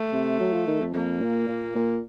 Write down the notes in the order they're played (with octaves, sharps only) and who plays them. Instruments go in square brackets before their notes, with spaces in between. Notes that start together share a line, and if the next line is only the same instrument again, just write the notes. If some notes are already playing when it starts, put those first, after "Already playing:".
Already playing: [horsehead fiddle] A3
[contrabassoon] C3
F#3
F3
D#3
F2
[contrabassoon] F2 [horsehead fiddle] A#3
[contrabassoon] A#2
A#2
A#2